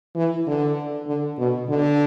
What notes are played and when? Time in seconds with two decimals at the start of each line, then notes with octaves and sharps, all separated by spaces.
0.15 E3
0.47 D3
1.07 D3
1.38 B2
1.69 D3